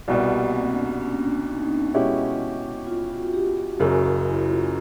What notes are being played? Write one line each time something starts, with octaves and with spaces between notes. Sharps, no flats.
C2 B2 G3 C4
A#3
C4
D4
C#4
C#4
D4
D#4
B2 G#3 C#4 E4 G4
F4
F#4
G4
G4
F#1 F#2 C#3 F#4
F#4
E4
F4